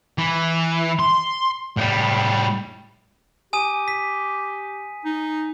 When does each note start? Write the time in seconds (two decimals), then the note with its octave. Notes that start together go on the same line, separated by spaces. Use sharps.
0.18 E3
1.00 C6
1.77 A2 G3
3.53 G4 G#5 D#6 D#7
3.88 B6
5.05 D#4